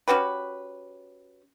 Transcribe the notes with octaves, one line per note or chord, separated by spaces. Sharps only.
C#4 F#4 G4 B4